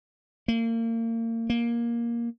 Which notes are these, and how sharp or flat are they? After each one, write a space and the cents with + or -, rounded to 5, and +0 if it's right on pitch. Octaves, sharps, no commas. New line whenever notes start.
A#3 -35
A#3 +10